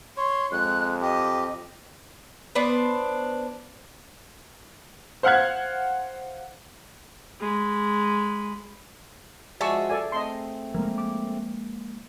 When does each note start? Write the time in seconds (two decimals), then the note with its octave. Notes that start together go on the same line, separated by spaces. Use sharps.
0.17 C#5 C6
0.52 F2 G#3 F#6
1.01 G4 D#5
2.55 B3 D4 C5
5.23 C5 F5 F#5 F6 F#6 G#6
7.40 G#3 B5
9.61 F3 G#3 F#4 G#4 D5 E5 A5 C#6
9.90 A4 D5 G#5
10.12 A3 C4 D#5 A5 C6
10.74 F3 G#3 A#3 A#4
10.98 D6